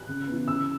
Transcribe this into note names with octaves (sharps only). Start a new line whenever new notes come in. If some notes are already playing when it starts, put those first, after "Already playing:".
Already playing: F#6
C#3
E3 B3
C#3 E6